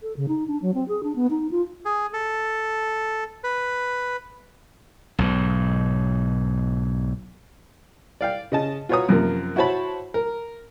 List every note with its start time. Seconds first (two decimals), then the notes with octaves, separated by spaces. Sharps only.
0.02 A4
0.16 C#3
0.28 D#4
0.47 D4
0.62 F#3
0.74 C4
0.88 G#4
1.03 D4
1.15 B3
1.30 D#4
1.51 F4
1.85 G#4
2.13 A4
3.44 B4
5.19 B1 G#2
8.21 D5 F5 G5
8.52 C#3 D#5 A5
8.89 F4 F#4 B4 C#5 A#5 D#6
9.09 F#2 C3 F3 A#3 A#4
9.56 E4 F#4 C5 C#5 A5 B5
10.14 A#4